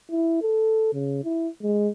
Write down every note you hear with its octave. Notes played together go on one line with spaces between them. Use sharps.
E4
A4
C#3
E4
G#3